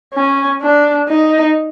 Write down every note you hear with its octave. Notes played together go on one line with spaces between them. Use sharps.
C#4
D4
D#4